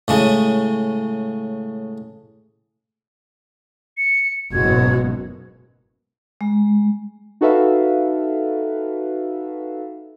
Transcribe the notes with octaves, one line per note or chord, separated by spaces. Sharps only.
A2 C#3 G#3
C#7
F#1 G#2 B2 F#4 G#6
G#3
D#4 F#4 A4 B4 E5 F5